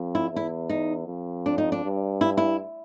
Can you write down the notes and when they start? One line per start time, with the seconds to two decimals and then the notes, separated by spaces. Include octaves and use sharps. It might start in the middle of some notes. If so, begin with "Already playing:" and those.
Already playing: F2
0.15 E4
0.31 E2
0.36 E4
0.70 D#4
1.07 F2
1.46 D4
1.58 D#4
1.72 D4
1.84 G2
2.21 E4
2.37 E4